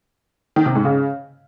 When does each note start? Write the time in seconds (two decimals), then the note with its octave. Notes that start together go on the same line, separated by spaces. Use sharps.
0.56 D#3
0.66 C3
0.75 G#2
0.85 C#3